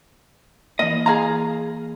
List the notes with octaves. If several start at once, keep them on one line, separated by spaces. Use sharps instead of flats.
E3 A#3 D#5
G#4 F5 A#5